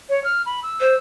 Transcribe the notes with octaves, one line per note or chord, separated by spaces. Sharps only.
C#5
F6
B5
E6
C5